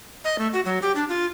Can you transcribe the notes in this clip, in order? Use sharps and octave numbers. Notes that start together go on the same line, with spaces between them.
D#5
A3
F#4
F#3
G4
D4
F4